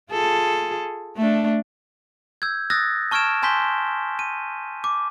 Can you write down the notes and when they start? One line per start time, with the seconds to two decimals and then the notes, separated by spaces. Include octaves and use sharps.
0.12 F4 G#4 A4
1.17 A3 D4
2.42 E6 G6 G#6
2.70 D#6 E6 F#6 A6 A#6
3.11 A5 C#6 F6 G#6 D7 E7
3.42 G#5 A5 C6 G6 B6 G7
4.19 D#7
4.84 D6